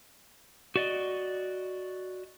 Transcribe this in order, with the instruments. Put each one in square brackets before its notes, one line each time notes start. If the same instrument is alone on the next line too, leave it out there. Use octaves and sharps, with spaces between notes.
[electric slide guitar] F#4 D5 D#5